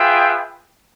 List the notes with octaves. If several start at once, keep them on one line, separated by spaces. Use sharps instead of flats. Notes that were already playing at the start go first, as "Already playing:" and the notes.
Already playing: F4 G#4 B4 E5 G5